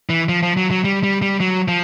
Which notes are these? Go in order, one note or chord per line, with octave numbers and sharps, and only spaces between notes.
E3
F3
F3
F#3
F#3
G3
G3
G3
F#3
F3